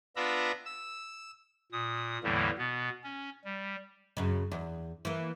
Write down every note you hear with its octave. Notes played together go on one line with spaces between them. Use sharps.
B3 D4 F4 E5 A#5 B5
E6
A#2 D#6
E2 A2 D3 E3 G3 A#3
B2 B3
C#4
G3
F#2 C#3
E2
E3 A#3